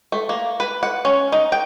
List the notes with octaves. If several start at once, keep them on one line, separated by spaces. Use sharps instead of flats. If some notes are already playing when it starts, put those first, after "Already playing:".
A3
A#3
B4
F#5
C#4
D#4
G5